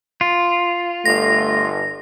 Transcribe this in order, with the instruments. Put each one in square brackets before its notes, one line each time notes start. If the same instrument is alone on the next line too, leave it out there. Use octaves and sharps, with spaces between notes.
[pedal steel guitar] F4
[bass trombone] G1 [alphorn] A3 [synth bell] A#6